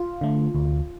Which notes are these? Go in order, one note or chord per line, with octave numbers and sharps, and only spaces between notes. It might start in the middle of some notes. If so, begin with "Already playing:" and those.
Already playing: F4
D3 A3
D2